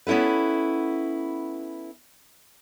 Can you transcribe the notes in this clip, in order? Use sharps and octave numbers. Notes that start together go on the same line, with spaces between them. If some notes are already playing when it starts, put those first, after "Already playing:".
B3 C#4 E4 A4 B4